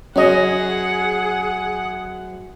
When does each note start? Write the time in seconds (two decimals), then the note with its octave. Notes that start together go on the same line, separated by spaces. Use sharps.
0.16 F#2 C#4 G#4 C#5 D#5 F#5